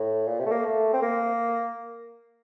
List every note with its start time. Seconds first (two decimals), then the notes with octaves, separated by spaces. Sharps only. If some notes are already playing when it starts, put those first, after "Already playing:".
Already playing: A2
0.26 A#2
0.39 C3
0.46 A3
0.51 A#3
0.65 A3
0.93 C4
1.02 A#3